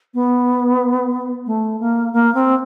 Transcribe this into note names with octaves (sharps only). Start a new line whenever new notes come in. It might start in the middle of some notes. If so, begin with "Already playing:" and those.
B3
A3
A#3
A#3
C4